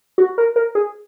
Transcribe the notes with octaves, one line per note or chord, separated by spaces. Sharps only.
F#4
A#4
A#4
G#4